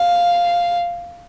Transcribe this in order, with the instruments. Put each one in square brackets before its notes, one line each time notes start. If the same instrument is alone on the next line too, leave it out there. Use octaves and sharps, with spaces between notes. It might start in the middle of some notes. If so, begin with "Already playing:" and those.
Already playing: [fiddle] F5